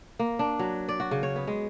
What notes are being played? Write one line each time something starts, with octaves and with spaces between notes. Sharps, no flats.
A#3
D4
F#3
D5
F#4
C#3
C#5
B3
G#3